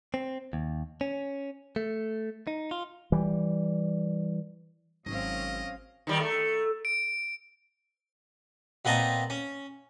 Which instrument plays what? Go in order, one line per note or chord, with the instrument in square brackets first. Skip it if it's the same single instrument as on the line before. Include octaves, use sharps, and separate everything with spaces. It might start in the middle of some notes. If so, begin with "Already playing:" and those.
[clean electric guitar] C4
D#2
C#4
A3
D#4
F4
[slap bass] E3 G3
[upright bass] G#1 [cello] F#3 C4 [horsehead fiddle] C#4 F5 [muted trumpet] D#5
[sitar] D#3 G3
A3
[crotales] D7
[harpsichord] A#2 B3 C4 D#5 A5 A#5
C#4